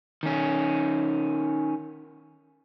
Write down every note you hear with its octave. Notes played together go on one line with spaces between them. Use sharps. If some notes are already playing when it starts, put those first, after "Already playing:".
D#3 C#4